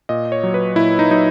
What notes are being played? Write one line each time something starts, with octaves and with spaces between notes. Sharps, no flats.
A#2 D#5
C#5
F#3
B4
A#2 E4
D#4
F#3 D#4